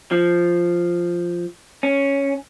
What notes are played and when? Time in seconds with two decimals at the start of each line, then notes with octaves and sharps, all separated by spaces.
0.11 F3
1.83 C#4